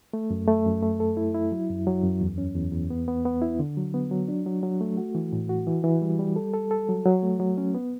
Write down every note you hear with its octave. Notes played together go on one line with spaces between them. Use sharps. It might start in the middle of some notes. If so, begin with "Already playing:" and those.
A3
F#2
A3
F#2
A3
A4
E4
E4
F#3
F#2
F#3
F#2
E2
C#4
E2
E2
B3
B3
B3
E4
D3
F#3
B3
F#3
D4
F#3
F#3
A3
F#4
E3
A2
F#4
E3
E3
G3
G3
A4
A4
A4
F#3
F#3
A3
F#3
C#4
B3